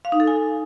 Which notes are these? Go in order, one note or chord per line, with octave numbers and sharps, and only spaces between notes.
F5
D#4
A4
G#5